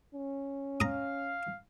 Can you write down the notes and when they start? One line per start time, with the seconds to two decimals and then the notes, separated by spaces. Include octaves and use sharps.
0.15 C#4
0.80 F5 A#5 D#6